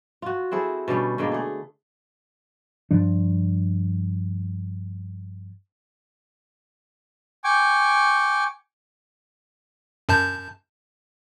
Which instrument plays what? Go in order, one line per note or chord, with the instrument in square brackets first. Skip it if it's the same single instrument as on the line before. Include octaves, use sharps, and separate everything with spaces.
[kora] F4 F#4
C4 E4 G#4 A4
B2 D3 G3 C#4
B2 D3 G#3 A#3
A3 G#4
[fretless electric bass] G2 F3 D4
[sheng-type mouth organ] G5 G#5 C#6 D6
[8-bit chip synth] F#2 A5 G6